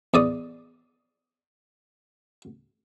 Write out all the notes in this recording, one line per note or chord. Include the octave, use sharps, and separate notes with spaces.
E2 D5 D#6